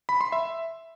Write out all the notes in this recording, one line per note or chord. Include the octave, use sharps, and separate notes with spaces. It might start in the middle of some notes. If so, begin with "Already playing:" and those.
B5
C6
E5